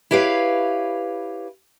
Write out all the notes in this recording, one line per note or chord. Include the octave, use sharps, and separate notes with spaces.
E4 G4 B4 C#5 F5